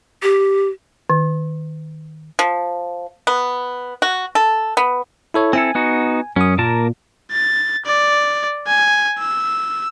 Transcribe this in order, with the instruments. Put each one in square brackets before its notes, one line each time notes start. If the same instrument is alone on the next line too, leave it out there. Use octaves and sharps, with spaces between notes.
[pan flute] G4
[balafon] D#3
[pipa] F3
B3
F#4
A4
B3
[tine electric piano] E4 A4 C#5
[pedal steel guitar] C4 E4 A4 [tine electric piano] G#5
[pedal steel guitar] B3 D#4 F#4
[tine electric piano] F#2 D#6 [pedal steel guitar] C#4
[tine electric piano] A#2 [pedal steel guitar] A#3 A#4 A5
[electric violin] A6
D5
G#5
E6